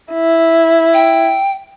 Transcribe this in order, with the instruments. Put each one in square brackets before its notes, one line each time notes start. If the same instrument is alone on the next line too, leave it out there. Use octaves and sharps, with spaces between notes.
[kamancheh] E4
[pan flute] G5